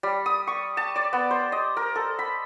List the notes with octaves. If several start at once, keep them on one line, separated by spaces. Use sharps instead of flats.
G3
D#6
C#6
A5
D5
B3
C5
D#5
A#4
A4
B5